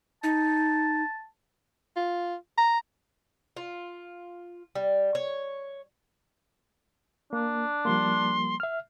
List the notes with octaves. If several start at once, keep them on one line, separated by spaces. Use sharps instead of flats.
D#4 A5
F4
A#5
F4
G3
C#5
A#3 D4
F3 G3 A#3 C6
E5 F6